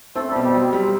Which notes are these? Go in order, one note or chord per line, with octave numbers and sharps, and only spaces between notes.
A3 C4 A4
G3 G4
B2
G3 G4
F#3 C4
G3